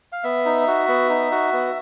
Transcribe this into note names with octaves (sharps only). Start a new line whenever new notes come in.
F5
B3 E5
D#4
F#4
B3
D#4
F#4
B3